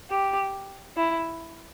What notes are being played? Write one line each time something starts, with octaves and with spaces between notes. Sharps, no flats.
G4
E4